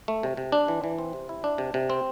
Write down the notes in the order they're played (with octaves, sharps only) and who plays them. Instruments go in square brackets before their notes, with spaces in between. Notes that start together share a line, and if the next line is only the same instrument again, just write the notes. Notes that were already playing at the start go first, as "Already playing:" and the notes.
[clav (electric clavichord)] A3
C3
C3
D4
E3
E3
C4
C3
E4
D4
C3
C3
C4